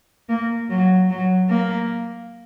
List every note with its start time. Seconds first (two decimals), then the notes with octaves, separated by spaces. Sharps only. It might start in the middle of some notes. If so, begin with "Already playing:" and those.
0.29 A#3
0.69 F#3
1.10 F#3
1.49 A#3